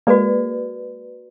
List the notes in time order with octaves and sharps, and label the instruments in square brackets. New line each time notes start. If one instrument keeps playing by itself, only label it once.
[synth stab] G#3 A#3 [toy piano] F#4 B4 D5